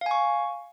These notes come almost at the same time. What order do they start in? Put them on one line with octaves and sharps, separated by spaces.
F5 G#5 C#6